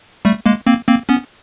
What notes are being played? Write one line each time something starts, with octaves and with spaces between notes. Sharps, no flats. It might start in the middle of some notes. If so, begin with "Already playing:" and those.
G3 A3
G#3 A#3
A#3 C4
A#3 C4
B3 C#4